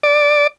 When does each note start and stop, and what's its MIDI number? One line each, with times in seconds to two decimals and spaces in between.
0.03 0.47 74